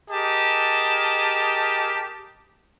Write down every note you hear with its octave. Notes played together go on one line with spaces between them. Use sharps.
G4 G#4 A#4 D#5 A5